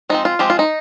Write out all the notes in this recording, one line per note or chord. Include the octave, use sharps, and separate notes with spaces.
F3 G#3 C4 D#4
F4
F3 G#3 C4 G4
F4
D#4